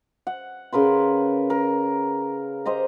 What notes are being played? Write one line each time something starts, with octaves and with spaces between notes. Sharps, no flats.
F#5
C#3 A#4 B4 C6
A#4
G4 C5 D#5 A#5